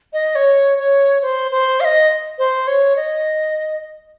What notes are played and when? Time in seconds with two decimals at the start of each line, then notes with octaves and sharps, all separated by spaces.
0.13 D#5
0.35 C#5
0.79 C#5
1.22 C5
1.51 C5
1.80 F5
1.85 D#5
2.38 C5
2.67 C#5
2.96 D#5